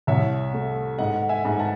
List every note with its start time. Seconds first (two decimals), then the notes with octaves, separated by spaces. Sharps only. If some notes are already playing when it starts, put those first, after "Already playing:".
0.07 C2 C#5 E5
0.53 A3
0.99 G#2 D#5 F#5
1.29 E5 G#5
1.45 G#2
1.59 F#5 A5